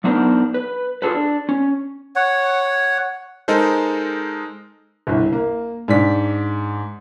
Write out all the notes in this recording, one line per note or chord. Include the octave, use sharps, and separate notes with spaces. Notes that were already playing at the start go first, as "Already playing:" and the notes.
F#3 B3 D4 D#4 A#4 C5
B4
F4 G#4 A4 B4
D4
C#4
C#5 F#5
G#3 D#4 A4 A#4 C5
G1 C2
A#3
G#2 D4 D5 B6